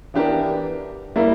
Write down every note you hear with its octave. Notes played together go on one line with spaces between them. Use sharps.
E3 B3 D4 G4 A#4
G3 A#3 E4 A#4